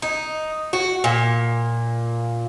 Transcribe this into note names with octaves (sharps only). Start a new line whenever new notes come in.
D#4
F#4
A#2